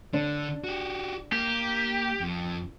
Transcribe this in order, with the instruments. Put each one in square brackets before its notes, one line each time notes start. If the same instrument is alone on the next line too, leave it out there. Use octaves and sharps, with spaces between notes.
[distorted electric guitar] D3 [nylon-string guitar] D4
[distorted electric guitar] F#4 G4
[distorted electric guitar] A#3 [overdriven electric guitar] G4
[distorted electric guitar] F2